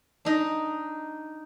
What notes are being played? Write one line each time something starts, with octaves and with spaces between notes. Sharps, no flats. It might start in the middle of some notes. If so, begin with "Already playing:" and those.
D4 D#4